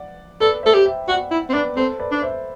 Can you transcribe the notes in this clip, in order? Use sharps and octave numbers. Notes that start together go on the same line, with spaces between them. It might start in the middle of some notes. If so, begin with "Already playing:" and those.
Already playing: D5 F#5
A4 B4 D5
A4 C5 E5
G4
E5 G5
F#4 D5 F#5
E4
C4
D4 B4 D5
C4 A4 C5
B4 D5
D4
C5 E5